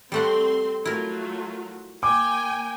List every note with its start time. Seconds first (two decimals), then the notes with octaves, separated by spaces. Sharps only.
0.12 G3 A3 C4 F#5 C6
0.85 F#3 A3 E4 F4 A#4
2.03 A#3 G5 G#5 D6